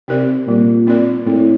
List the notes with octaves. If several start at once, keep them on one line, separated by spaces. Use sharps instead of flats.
C3 C4 D#4 A#4 D5
A#2 G3
C4 D#4 A#4 D5
A2 C4